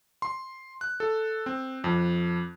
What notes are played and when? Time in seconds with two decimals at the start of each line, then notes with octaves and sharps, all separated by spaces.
0.22 C6
0.81 F#6
1.00 A4
1.46 C4
1.84 F2